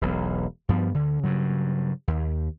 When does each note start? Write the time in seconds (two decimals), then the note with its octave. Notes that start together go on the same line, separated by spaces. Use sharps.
0.01 E1 B1
0.69 G2 F3 B3
0.94 D2 D3
1.23 G2 C#3 F#3
2.08 D#2